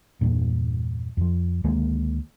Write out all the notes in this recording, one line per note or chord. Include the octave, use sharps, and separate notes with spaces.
E2 G2 A#2
F2 F3
D2 D#3 G#3 A#3